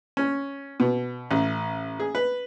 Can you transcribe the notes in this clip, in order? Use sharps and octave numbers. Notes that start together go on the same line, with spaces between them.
C#4
B2
A1
G#4
B4